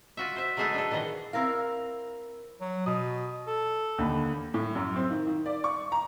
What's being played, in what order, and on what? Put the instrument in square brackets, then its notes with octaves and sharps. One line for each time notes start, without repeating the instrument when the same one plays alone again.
[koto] F4 F#4 E5
C5 E5
F#3 G#3 A3 G#4 A4 B4
D4 A4
A#2 D#3 E3 G#4 D#5
[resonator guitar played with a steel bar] C4 E4 A#4 F5
[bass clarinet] F#3
[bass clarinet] B2 [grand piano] D#6
[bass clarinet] A4
[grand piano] D#2 D3 B5
[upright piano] A2
F#2
C4
D#3
D#3
D5
C#6
A#5